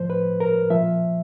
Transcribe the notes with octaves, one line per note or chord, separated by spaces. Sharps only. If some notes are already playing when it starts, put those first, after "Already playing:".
Already playing: A2 F3 C5
B4
A#4
A#2 F3 E5